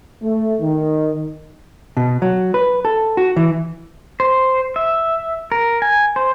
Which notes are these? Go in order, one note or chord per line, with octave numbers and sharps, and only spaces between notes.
A3
D#3
B2
F#3
B4
A4
F#4
E3
C5
E5
A#4
G#5
C5